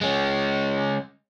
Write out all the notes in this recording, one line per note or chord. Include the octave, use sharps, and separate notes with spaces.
G#3 C#4